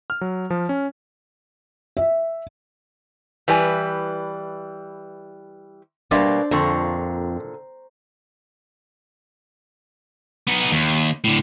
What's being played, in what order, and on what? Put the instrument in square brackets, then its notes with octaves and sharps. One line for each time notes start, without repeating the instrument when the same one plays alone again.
[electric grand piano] F6
F#3
F3
C#4
[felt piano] E5
[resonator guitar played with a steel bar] E3 G3 B4 G#5
[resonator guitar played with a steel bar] B2 A#3 [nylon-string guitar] G3 [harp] D4 C5 [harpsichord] D5 E5 C6
[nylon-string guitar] F2 [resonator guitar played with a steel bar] A#2 D3 [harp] C5 A#5 C#6
[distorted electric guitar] B3 D#4
D#2
A2 D3